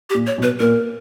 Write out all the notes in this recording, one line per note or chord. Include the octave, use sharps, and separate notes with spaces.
G4
A#2
C#5
B2
B4
A#2 A#4